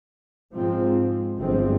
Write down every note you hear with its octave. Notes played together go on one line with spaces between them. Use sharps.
G#2 F3 G#3 C4
G1 G2 F3 G#3 C4